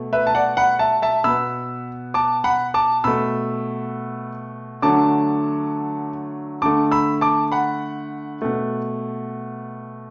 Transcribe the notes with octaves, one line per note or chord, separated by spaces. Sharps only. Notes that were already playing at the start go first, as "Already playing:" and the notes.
Already playing: B2 A3
B4 E5
A5
D5 F#5
F#5 B5
E5 A5
E5 A5
B2 B3 B5 E6
A5 D6
F#5 B5
A5 D6
B2 A3 B5 E6
D3 F#3 A3 A5 D6
D3 A3 A5 D6
B5 E6
A5 D6
F#5 B5
B2 A3